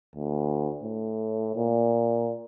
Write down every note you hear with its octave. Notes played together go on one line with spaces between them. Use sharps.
D2
A2
A#2